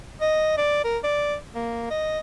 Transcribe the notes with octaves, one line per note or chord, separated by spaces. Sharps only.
D#5
D5
A#4
D5
A#3
D#5